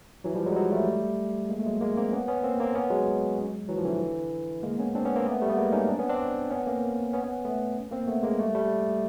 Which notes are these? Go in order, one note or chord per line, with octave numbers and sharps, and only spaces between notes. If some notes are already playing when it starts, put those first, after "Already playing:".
E3 F#3
F3 G3
F#3 G#3
G3
F#3 G#3
G3 A3
G#3 A#3
A3
F#3 G#3
G#3 A#3
A#3 C4
B3 C#4
B3 C#4
A#3 C4
A#3 C4
B3 C#4
F#3 G#3
E3 F#3
F3
D3 E3
G#3 A#3
B3 C#4
C4 D4
B3 C#4
A#3 C4
A3 B3
G3 A3
B3
G#3 A#3
C#4 D#4
C4 D4
B3 C#4
C4 D4
B3 C#4
A#3 C4
B3 C#4
B3 C#4
A3 B3
A#3 C4
A3 B3
G#3 A#3
G3 A3
G3 A3